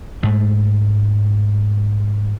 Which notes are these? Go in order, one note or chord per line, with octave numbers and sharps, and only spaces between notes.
G#2 G#3 A3